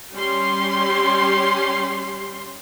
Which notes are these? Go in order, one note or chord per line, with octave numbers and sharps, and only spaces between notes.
G3 C#4 G4 C6